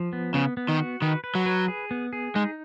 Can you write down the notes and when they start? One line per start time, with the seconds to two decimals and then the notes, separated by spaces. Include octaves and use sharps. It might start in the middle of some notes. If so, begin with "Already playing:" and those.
Already playing: F3
0.13 B3
0.34 C#3 B3
0.57 B3
0.68 D#3
0.79 F#4
1.01 D#3 B4
1.24 B4
1.35 F#3
1.46 B4
1.68 G#4
1.91 B3
2.13 G#4
2.35 G#3 D#4